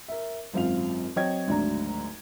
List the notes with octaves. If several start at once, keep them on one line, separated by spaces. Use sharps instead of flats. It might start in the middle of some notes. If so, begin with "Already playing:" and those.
A#4 E5
G#1 F#2 C4 F4 F5 F7
F#3 C4 C#5 D#5 G5 G#6
G#1 D2 F#3 D4 D5 A#5